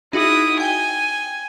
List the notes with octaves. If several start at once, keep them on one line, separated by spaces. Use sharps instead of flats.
D#4 E4 F#4 G#4 D#6
G5 G#5 G7